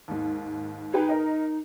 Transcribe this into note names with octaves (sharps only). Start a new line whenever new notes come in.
D#2 G#2
D#4 G#4 B4 G5
A#4 D#5